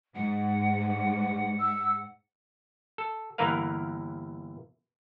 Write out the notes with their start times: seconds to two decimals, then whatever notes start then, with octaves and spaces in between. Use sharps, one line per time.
0.15 G#2 F#5
1.60 E6
2.98 A4
3.38 G1 E3 A#3 A#4 B4 F5